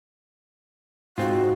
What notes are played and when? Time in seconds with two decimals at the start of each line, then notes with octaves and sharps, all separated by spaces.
1.18 G#2 C4 F4 F#4